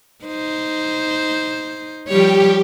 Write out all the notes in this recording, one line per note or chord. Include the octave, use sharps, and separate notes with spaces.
D#4 C5
F3 G3 G4 C#5